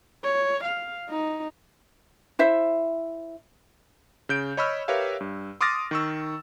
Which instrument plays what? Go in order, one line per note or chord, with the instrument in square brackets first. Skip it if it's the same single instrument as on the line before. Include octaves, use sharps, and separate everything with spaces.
[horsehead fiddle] C#5
F5
D#4
[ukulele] E4 C5 E5
[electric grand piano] C#3 G6 D7
C#5 D#5 B5 C#6 E6 F6
G4 A#4 B4 C#5 E5 F5
G2
C6 D6 D#6 F6 A6 A#6
D#3 C#6 E6